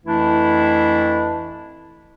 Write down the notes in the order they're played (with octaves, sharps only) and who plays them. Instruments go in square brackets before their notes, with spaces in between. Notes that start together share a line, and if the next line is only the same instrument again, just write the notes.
[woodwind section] F2 E3 A3 D4 E4